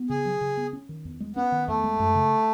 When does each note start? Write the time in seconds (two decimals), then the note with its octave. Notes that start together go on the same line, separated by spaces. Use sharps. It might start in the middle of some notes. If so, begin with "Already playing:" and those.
Already playing: B3
0.10 C#3 G#4
0.25 F#3
0.41 C#3
0.57 B3
0.73 C#4
0.89 D#3
1.05 E2
1.20 G#3
1.36 B3 C#4
1.52 D#3
1.68 E2 A3
1.84 G#3
2.00 F#2
2.15 C#3